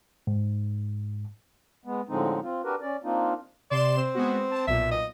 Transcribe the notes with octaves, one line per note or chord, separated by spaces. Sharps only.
G#2
G#3 B3
A2 D3 F3 G#3 C4 D#4
C4 F4
D4 F#4 G4 A#4 B4
C#4 D5
A#3 C4 D4 D#4 F4
C3 D5 C6 E7
C4
G#3 B3 F#4
A5
B1 A#2 E5
D#5